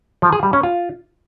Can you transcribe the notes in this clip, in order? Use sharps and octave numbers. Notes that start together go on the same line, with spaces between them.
F3
G#4
G3
C#4
F4